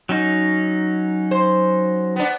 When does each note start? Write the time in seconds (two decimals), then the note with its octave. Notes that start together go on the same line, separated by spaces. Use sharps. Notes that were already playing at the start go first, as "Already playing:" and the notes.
0.09 F#3 C#4 D#4
1.31 C5
2.16 B3 D4